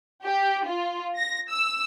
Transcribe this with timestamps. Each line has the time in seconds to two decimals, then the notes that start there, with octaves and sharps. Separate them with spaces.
0.24 G4
0.66 F4
1.17 A#6
1.50 E6